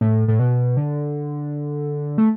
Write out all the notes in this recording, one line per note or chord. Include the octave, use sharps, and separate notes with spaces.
A2
A2
B2
D3
A3